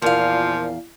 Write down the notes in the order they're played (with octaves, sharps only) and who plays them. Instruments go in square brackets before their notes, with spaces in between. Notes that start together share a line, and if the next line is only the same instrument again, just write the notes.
[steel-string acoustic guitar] E2 F5 [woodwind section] A#2 [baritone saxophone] F3